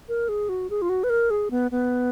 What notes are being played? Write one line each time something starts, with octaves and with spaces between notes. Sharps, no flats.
A#4
G#4
F#4
G#4
F4
F#4
B4
A#4
G#4
B3
B3